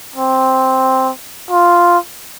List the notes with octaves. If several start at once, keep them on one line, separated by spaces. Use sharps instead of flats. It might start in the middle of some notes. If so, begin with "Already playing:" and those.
C4
F4